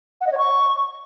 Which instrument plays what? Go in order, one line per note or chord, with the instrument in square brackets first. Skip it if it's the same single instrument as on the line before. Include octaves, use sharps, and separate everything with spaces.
[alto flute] F#5
D#5
C#5
C#6